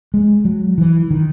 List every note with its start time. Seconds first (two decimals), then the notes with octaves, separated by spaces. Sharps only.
0.14 G#3
0.45 F#3
0.78 E3
1.11 D#3